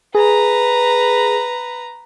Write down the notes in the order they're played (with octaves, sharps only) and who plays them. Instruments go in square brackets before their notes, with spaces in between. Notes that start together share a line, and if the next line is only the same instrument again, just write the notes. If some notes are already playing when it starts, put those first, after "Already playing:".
[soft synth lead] G#4 [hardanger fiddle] B4 A#5